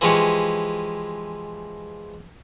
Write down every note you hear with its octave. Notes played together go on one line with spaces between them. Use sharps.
E3 F3 G#3 G4 C#6